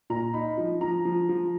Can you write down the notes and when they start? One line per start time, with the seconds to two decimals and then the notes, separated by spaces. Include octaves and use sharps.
0.10 A#2 A#5
0.33 D#4 B5
0.57 F3
0.81 F3 A#5
1.05 F3
1.29 F3